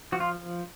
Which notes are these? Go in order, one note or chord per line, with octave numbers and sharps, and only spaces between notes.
F3 F#4
F4